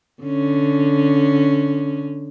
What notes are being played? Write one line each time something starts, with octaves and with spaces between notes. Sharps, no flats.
D3 C#4